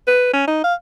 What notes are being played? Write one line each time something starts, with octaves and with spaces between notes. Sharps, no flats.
B4
C#4
D#4
F5